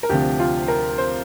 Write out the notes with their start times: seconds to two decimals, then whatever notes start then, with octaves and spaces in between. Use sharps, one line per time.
0.03 A#4
0.09 D2 C3 F3 G4
0.39 F4
0.68 A#4
0.98 C5